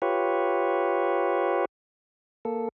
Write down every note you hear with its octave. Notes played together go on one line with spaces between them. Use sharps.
F4 G4 B4 C#5
A#3 A4